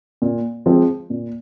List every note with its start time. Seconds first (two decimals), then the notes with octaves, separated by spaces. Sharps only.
0.22 A#2
0.66 F3 G#3 C4
1.10 A#2